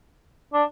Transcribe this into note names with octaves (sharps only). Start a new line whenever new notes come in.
D4